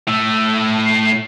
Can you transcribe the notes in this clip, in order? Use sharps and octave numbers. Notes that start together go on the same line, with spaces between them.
A2 A3 E6
C7